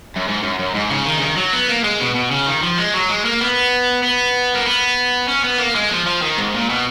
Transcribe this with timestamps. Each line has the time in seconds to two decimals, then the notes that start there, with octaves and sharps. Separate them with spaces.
0.16 F#2
0.28 G#2
0.43 F#2
0.59 F#2
0.74 G#2
0.90 C#3
1.06 D#3
1.18 C#3
1.22 D#3
1.37 F#3
1.53 B3
1.68 A#3
1.84 G#3
2.00 B2
2.15 B2
2.31 C#3
2.46 D#3
2.62 F3
2.78 G#3
2.94 F#3
3.09 G#3
3.25 A#3
3.40 B3
4.03 B3
4.55 A#3
4.66 B3
5.28 C#4
5.44 B3
5.59 A#3
5.75 G#3
5.90 F3
6.06 F3
6.22 D#3
6.37 G#2
6.54 A#2
6.69 B2